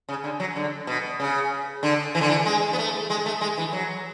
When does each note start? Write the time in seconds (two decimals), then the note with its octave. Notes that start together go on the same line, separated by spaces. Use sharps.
0.09 C#3
0.24 D3
0.40 F#3
0.56 D3
0.87 B2
1.20 C#3
1.83 D3
2.15 E3
2.21 D3
2.29 E3
2.46 G#3
2.73 B3
2.78 A3
3.10 G#3
3.26 A3
3.41 G#3
3.57 E3
3.73 F#3